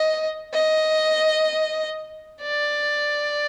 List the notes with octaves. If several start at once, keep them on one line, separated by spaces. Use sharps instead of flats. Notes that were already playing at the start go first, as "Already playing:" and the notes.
Already playing: D#5
D#5
D5